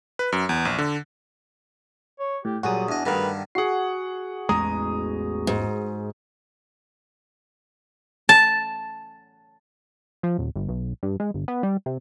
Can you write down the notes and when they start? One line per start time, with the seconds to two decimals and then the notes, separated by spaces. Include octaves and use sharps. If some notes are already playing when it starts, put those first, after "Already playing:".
0.19 B4
0.32 F#2
0.49 E2
0.65 A#1
0.78 D3
2.20 C#5
2.45 A2 G4
2.63 A#2 F#3 G3 F#4 G#4 D#6
2.89 E2 D4 D#5
3.06 G2 D3 D#3 A3 A#4 B4
3.55 F#4 G#4 F#5 C7
4.49 A1 E2 G#3 A#5 D#6
5.47 G#2
8.29 A5
10.23 F3
10.38 D#1
10.56 G1
10.69 B1
11.03 G2
11.20 G#3
11.34 G1
11.48 B3
11.63 G3
11.86 C3